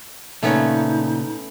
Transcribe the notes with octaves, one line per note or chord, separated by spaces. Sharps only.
A#2 C#3 A3 B3 C#4 D#4